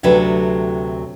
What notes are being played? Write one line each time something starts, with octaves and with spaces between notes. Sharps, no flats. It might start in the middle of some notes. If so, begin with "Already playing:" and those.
D2 C3 F#3 D4 A4 B4